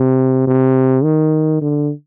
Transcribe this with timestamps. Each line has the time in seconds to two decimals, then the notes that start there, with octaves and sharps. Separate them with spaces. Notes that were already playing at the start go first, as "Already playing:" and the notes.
Already playing: C3
0.47 C3
1.04 D#3
1.62 D3